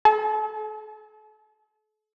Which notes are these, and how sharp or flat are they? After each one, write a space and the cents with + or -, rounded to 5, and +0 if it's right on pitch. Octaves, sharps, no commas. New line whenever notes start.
A4 -40